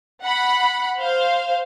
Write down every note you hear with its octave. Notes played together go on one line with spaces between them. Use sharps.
F#5 B5
C5 F5